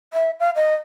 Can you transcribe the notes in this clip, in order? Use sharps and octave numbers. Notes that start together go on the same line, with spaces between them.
E5
F5
D#5